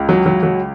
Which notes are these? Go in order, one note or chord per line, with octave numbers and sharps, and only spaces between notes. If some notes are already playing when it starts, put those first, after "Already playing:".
Already playing: C#2
F#3
F#3
F#3